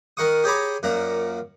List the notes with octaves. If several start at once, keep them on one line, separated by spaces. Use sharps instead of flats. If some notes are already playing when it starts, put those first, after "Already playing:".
D#3 A#4 F#5 C#6 D#6
G4 G#4 C#5 A#5 B5 D6
F#2 A#2 F#5 A#5